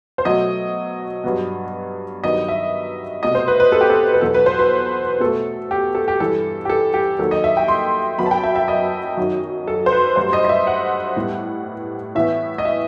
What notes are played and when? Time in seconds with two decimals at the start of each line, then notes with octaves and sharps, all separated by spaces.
0.18 C5
0.25 B2 F#3 A3 D#5
1.24 G2 F#3 B3
2.24 G2 D#3 F#3 B3 D#5
2.48 E5
3.22 C2 B2 A3 D#5
3.35 C5
3.48 B4
3.60 B4
3.72 A4
3.81 G4
3.90 A4
4.13 B4
4.21 E2 B2 F#3 B3 A4
4.34 B4
4.46 C5
4.59 B4
5.20 B2 A3 A4
5.71 G4
5.95 A4
6.08 G4
6.20 G2 E3 G3 A4
6.65 G4
6.69 A4
6.94 G4
7.19 D#2 D#3 F#3 A4
7.31 D#5
7.44 E5
7.57 G5
7.68 C6
8.18 F#2 F#3 B3 B5
8.26 A5
8.31 G5
8.43 E5
8.56 E5
8.68 D#5
9.17 F#2 D#3 F#3
9.68 A4
9.86 C5
9.92 B4
10.16 G2 F#3 A3 C5
10.33 D#5
10.45 D#5
10.49 E5
10.67 F#5
11.17 A2 G3 B3
12.15 A2 E3 B3 E5
12.58 D#5
12.65 E5